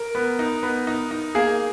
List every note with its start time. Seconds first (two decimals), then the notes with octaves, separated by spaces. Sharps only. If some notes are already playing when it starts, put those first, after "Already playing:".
Already playing: A#4
0.15 B3
0.39 D#4
0.63 B3
0.87 D#4
1.11 D#4
1.35 A#3 G#4